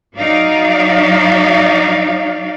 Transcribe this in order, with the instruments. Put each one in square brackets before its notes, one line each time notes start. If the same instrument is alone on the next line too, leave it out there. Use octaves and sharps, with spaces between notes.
[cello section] F#3 D#4 D5 F5